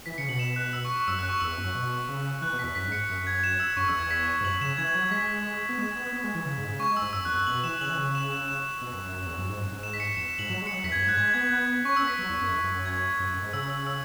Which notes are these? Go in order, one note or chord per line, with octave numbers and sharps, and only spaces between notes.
E3 B6
C#3 C#7
B2 F#7
E7
F#6
E6
C#6
C#6
F#2 E6
F#6
C#6
E2 E6
F#2
B2
C#3
E3 F#6
B2
B6
E2
F#2 B6
G#2
C#7
F#2
G#6
E7
E6
F#2 C#6
E2 E6
E2 G#6
B6
E7
G#2
F#2 F#7
C#3 E7
E3 G#6
F#3
G#3 B6
B3
G#3 E7
B3
B3
G#3
E3
C#3
G#2
C#3
G#3 C#6
G#3
E6
G#2
F#2 E6
E2 F#6
F#2 F#6
B2 F#7
E3 E7
C#3 F#7
E3
C#3
E7
E7
E7
B2
F#2
F#2
F#2
E2
F#2
G#2
F#2
G#2
E7
B6
C#7
E2 E7
E7
G#2 F#7
F#3 E7
G#3
C#7
F#3
E2 B6
G#6
F#2
G#2 F#6
G#3 G#6
B3 G#6
B3 F#6
C#4 C#6
E6
B3
B6
F#3
E2
F#2
E2
F#2
F#2
G#6
F#2
F#2
G#2
C#3 E6
E6
E6